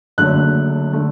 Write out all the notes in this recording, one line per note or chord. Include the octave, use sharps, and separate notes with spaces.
F#1 F#2 D3 A3 F#6
D3 A3